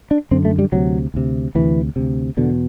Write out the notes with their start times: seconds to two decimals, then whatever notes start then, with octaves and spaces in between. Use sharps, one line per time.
0.11 D4
0.31 F#2 D3 C4
0.45 A3
0.59 G3
0.72 D2 C3 F#3
1.14 D2 C3
1.55 D2 C3 E3
1.96 D2 C3
2.37 E2 B2 D3